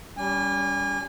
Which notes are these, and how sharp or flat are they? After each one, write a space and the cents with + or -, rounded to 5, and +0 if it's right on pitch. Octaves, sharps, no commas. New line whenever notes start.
G3 +0 C#4 +40 G#5 -35